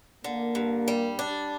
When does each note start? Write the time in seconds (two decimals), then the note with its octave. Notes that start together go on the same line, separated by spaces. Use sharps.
0.24 D3 A#3
0.55 G2
0.88 G3
1.19 D4